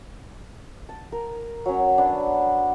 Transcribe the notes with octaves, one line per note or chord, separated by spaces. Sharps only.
A5
A#4
F#3 C#4
B3 D4